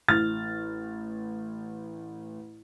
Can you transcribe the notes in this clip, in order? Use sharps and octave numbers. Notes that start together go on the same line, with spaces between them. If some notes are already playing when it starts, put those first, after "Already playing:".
A1 F6 A6